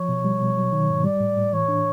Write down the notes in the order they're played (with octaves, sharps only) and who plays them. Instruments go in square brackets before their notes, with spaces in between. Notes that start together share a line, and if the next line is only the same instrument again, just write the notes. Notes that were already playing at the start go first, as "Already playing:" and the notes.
Already playing: [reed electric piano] F3 [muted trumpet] C#5
[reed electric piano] B2
G3
B2
F#3
D#3
G#2
[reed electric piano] G3 [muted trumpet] D5
[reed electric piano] A2
A2
[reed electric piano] E3 [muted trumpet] C#5
[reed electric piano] D4